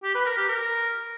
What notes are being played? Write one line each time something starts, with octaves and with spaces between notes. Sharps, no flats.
G4
B4
A#4
G4
A#4